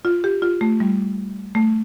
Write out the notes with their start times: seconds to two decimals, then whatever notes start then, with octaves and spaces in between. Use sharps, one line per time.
0.05 F4
0.24 G4
0.42 F4
0.61 A3
0.80 G3
1.55 A3